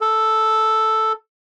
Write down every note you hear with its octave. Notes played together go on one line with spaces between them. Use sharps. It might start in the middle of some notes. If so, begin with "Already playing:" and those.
A4